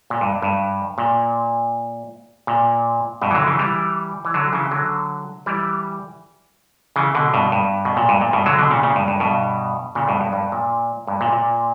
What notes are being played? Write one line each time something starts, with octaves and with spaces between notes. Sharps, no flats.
A#2
G2
G2
A#2
A#2
G2 B2
E3
D3 F#3
C#3 E3
E3 G3
E3
D3 F#3
C#3 E3
D3 F#3
E3 G3
C#3 E3
B2 D3
G2 B2
G2
B2
A#2
G2
A#2
G2 B2
D3 F#3
B2 D3
A#2 C#3
A#2 C#3
G2
G2
G2 B2
A#2 C#3
G2 B2
G2
G2
A#2
G2
A#2
A#2